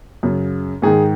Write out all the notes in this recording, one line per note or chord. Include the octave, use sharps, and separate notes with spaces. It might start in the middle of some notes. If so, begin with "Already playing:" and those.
F#2 C#3
G#2 D#3 G#4